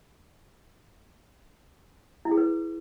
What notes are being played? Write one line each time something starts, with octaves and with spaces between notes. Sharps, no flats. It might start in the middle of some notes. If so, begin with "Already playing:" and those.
E4
G#4
B4